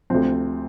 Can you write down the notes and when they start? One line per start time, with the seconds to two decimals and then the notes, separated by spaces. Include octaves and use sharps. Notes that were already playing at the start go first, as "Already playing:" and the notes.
0.10 D2 C3 F3 C4